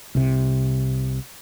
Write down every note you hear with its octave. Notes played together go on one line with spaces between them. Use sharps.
C2 C3